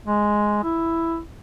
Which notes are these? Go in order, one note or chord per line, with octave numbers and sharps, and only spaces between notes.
G#3
E4